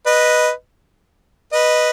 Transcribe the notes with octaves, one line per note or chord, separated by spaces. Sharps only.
B4 D#5
B4 D#5